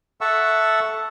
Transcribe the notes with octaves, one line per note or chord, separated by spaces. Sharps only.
A4 E5 F#5 A5 C#6 E6